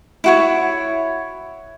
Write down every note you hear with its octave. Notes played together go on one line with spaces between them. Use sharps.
E4 F#4 C#5